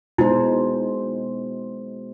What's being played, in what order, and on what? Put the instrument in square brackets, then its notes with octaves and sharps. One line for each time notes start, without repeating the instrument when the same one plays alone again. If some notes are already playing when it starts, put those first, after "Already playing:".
[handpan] B2 G#3 C5 [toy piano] D#4 E4